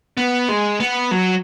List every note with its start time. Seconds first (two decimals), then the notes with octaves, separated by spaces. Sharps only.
0.18 B3
0.49 G#3
0.80 B3
1.12 F#3